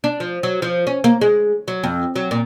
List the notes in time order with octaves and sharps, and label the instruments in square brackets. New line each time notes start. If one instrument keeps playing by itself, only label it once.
[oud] D4
F3
F#3
F3
C#4
A#3
G#3
F#3
F2
F#3
A#2